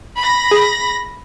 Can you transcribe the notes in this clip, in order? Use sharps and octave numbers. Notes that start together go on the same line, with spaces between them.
B5 A#6
G#4